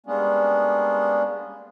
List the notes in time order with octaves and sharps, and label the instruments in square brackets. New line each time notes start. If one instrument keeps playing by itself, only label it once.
[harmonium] G3 G#3 A#3 B3 C#4 D4